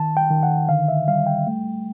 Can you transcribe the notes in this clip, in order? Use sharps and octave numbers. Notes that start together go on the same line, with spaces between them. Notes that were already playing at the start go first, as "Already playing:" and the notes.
Already playing: D#3 A5
G5
D#3
F#5
D3 F5
E5
G3 F5
G5
A3